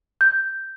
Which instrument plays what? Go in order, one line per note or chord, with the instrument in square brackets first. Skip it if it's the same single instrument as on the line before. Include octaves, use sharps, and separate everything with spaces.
[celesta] G6